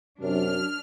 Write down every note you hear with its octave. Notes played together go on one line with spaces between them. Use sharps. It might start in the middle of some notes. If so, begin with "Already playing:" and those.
F#2 C3 F#3 D4 F6